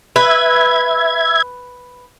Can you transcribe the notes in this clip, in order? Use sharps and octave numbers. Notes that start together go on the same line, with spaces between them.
B4 E5 G#6